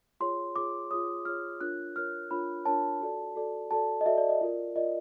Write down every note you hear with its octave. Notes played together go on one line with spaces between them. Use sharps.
F4 G#4 C#5 C6
F4 G#4 C#5 D6
F4 G#4 C#5 D#6
F4 G#4 C#5 F6
D4 F4 A#4 C#5 F#6
D4 F4 A#4 C#5 F6
D4 F4 A#4 C#5 B5
D4 F4 A#4 C#5 A5
F#4 A4 D5
F#4 A4 D5
F#4 A4 D5 A5
D#5
F#4 A4 D5 E5
D5
D#5
F4 A#4 D5
F4 A#4 D5 D#5